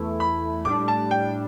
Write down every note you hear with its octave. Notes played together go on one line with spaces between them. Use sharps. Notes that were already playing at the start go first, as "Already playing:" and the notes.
Already playing: E2 E3 A3 E4
B5
A2 G3 D4 D6
A5
G5